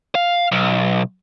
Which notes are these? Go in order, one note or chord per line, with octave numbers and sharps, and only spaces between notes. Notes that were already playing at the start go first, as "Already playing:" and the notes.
F5
B1